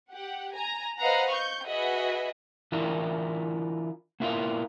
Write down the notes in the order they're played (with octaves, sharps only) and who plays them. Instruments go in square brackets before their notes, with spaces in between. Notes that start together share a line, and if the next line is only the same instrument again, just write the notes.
[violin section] G4 F#5
G#5 A#5
B4 C5 D#5 F5 F#5 A#5
C#6 G6
F#4 G#4 B4 D#5 E5 F#5
[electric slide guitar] E3 D4 E4 F4 A#4
A#3 B3 E4 F4 A#4 F5